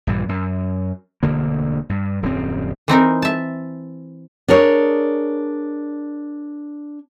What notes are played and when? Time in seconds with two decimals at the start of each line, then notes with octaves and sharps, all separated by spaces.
0.07 A#1 G2 A#2 E3
0.29 F#2
1.23 E1 D2 D3 A#3
1.89 G2
2.22 D#1 F#2 G#3 C4
2.88 E3 C4 D#4 A#4
3.22 E5 A5
4.48 D4 G#4 A#4 C#5